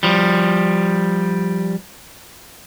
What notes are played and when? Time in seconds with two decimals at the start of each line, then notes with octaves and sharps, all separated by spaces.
0.03 F3 G3